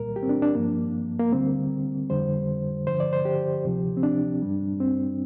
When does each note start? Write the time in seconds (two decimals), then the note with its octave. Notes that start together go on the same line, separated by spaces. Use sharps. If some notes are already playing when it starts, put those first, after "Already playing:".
Already playing: C2 A#2 G3 A#4
0.16 G4
0.23 C4
0.29 D4
0.42 D4
0.55 G2 F3 A#3
1.19 A#3
1.32 D2 D3 G3 C4
2.10 F2 D3 G3 C5
2.87 G2 D3 F3 C5
3.00 D5
3.13 C5
3.25 G4
3.64 D2 C3 F3
3.97 C4
4.03 D4
4.42 G2 G3
4.80 C4